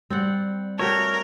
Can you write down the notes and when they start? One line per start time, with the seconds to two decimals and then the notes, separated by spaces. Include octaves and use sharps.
0.10 G3 C4 D5 F#5
0.79 A3 F#4 G4 A#4 C#5